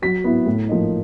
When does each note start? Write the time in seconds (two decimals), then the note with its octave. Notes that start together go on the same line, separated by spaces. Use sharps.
0.02 F#3 B6
0.24 B3 E4
0.46 A2
0.69 F3 A#3 D#4